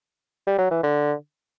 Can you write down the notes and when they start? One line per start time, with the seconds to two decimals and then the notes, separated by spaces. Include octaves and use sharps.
0.47 G3
0.58 F#3
0.71 E3
0.83 D3